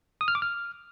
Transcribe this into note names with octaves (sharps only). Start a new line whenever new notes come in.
D#6
F6
D6
F6